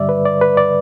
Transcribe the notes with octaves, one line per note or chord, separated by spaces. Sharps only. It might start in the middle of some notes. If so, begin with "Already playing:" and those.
Already playing: G2 D3 G3 D5 E5
B4
D5
B4
D5